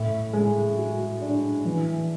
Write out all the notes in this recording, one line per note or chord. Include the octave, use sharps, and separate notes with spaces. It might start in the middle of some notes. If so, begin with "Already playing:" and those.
Already playing: A2
G#3
F#4
D4
E3